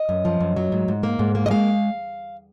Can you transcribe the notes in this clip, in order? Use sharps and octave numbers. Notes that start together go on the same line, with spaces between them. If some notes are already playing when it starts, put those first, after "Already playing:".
Already playing: D#5
F#2
F3
F#2
F#3
G#2
G#2
A#3
G#2
A#3
D#5
G#3 F5